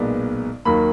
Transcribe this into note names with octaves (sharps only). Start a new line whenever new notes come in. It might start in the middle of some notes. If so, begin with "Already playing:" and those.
Already playing: B1 A#2 G#3 B3 D5
D#2 D#3 F#3 A#3 B5